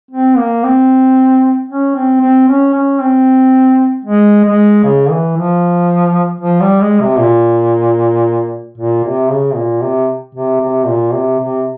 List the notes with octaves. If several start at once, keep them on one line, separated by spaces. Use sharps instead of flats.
C4
A#3
C4
C#4
C4
C4
C#4
C#4
C4
G#3
G#3
C#3
E3
F3
F3
G3
G#3
C3
A#2
A#2
C3
C#3
A#2
C3
C3
C3
A#2
C3
C3